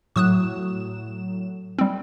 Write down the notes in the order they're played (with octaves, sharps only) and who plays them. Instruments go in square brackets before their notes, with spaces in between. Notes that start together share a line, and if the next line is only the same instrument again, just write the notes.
[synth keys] A2 F#3 E7 [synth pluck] C#6 D#6 F#6
[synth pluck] G3 C4